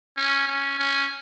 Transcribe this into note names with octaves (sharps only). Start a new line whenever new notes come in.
C#4
C#4
C#4